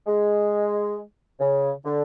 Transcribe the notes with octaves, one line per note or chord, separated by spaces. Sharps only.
G#3
C#3
D3